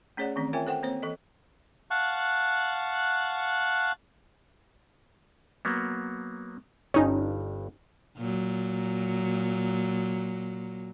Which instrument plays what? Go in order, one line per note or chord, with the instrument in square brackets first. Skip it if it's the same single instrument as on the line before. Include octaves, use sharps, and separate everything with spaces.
[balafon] A3 C#4 G#4 C#5 D5 F#5
D#3 E3 A3 C4 C#4
F4 A#4 C#5 E5 G5 G#5
A4 C5 F#5 G5
A#3 C4 C5 C#5
E3 A4 D#5
[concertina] F5 F#5 A5 C#6 F#6
[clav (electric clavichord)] F#3 A#3 B3
[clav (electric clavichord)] G1 G2 [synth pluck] C#4 D#4
[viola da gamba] A#2 F#3